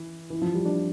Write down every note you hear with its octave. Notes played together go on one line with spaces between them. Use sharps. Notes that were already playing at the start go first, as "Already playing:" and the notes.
Already playing: E3
E3
F3
G3
D4